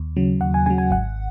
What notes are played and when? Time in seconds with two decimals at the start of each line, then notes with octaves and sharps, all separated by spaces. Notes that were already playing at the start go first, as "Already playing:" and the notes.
Already playing: D#2
0.17 C#3 F#3
0.41 D#2 F#5
0.54 G#5
0.66 C#3 F#3 G#5
0.78 G#5
0.91 G#1 F#5